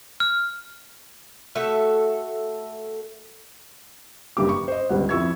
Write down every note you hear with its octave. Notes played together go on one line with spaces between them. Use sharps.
F6
A3 F#4 A4 E5
F#1 G2 G4 D6
C#6
C5 D#5
G1 C#2 G3 F#5
F2 E4 E5 C#6 E6 G#6